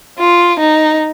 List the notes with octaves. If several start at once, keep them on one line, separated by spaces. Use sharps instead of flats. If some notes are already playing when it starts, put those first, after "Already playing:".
F4
D#4